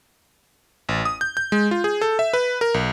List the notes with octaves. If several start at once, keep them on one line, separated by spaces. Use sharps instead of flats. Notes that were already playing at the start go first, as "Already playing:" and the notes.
A1
D#6
G6
G6
G#3
F4
G#4
A4
E5
B4
A#4
B1